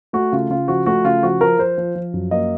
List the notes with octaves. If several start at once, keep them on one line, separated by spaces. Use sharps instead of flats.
A3 F#4
C#3 F4
C#3 F4
F3 F#4
A3 F#4
C#3 F4
F3 F#4
F3 A#4
F3 C5
F3
F3
F#2
A#3 D#5